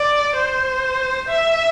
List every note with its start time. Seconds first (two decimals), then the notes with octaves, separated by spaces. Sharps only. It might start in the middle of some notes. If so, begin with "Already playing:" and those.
Already playing: D5
0.36 C5
1.28 E5